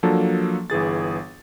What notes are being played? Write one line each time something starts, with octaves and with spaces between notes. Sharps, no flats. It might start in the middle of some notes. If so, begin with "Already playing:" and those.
F3 F#3 A#3 D4 A4
G1 E3 G#4 A6